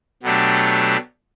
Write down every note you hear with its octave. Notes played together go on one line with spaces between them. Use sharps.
B2 F#3 A3 D4 G4